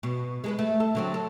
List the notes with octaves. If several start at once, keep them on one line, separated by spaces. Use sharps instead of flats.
B2
G#3 G#4 B4
A3
A4
D3 F#3 C4
A4